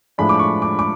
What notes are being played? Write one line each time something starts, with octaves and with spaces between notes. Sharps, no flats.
A2 F3 G#3 D4 B5
D6
C#6
D6
D6